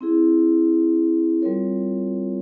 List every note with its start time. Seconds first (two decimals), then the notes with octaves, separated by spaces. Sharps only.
0.01 C4 E4 G#4
1.42 G3 C4 F4 A#4 C#5